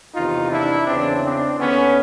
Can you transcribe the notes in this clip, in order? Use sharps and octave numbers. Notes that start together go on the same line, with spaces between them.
E2 C3 D#3 D#4 F4
D4 E4
E2 C#3 E3 C4 D4
C4 D4
D#2 D3 B3 C#4